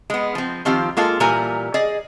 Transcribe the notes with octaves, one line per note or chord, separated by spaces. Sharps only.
G#3 B3
F3 C4
D#3 F3 C4 F4 G4
G#3 A#3 F4 A4
A#2 E3 G3 A#4 G#5 A#5
G#4 D5 D#5